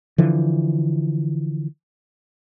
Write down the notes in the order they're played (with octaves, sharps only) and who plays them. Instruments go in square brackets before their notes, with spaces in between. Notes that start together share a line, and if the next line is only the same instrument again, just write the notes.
[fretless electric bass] D3 E3 F3